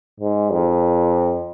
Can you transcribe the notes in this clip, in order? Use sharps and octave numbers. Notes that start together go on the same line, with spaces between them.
G#2
F2